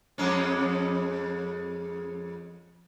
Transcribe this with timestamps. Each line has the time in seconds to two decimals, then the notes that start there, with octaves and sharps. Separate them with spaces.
0.18 F2 G#3 C#4